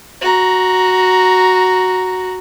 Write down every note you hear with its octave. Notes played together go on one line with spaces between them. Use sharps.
F#4 A#5